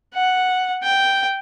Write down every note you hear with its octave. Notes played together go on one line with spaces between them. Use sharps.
F#5
G5